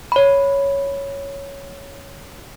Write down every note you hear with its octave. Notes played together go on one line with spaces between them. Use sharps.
C#5 B5